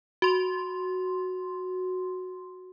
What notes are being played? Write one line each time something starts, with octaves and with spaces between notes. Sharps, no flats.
F#4 C6